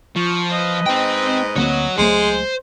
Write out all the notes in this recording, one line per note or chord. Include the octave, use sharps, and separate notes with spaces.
F3 C#6
B4 D#5
G#2 C4 G5
D2 A#3 C4 F#4 C#5
C#2 F#3 G#3 A3 C5